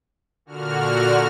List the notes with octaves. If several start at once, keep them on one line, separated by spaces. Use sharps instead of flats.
A#2 D3 F#4 F6